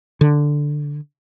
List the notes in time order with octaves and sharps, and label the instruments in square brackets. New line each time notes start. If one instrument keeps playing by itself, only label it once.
[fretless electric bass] D3